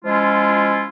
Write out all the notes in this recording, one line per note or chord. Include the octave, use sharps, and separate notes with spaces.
F3 G#3 C#4 E4 F4